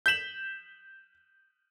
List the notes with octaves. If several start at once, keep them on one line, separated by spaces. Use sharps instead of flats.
G6 B6 E7 F#7